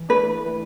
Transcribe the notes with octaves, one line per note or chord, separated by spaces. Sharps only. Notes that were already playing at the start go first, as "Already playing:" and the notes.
Already playing: E3
A3 D4 B4
E3